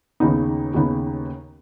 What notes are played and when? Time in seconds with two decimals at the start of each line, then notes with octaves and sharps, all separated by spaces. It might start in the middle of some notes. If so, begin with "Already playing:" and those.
0.20 D#2 C#3 B3 D#4
0.74 D#2 C#3 B3 D#4